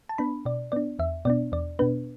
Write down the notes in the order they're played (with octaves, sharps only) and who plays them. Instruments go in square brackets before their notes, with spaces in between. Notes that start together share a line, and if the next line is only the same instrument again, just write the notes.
[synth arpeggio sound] A5
B3 D4 B5
B2 D5
B3 D4 D5
E2 E5
B2 B3 D4 D5
E2 D5
B2 B3 D4 B4